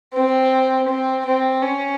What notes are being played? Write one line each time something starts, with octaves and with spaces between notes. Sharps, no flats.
C4
C4
C4
C#4